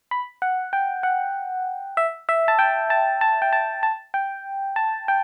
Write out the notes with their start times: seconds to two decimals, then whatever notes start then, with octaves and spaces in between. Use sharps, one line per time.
0.11 B5
0.42 F#5
0.73 G5
1.03 F#5
1.97 E5
2.29 E5
2.48 A5
2.59 G5
2.90 A5
3.21 A5
3.42 G5
3.53 A5
3.83 A5
4.14 G5
4.76 A5
5.08 G5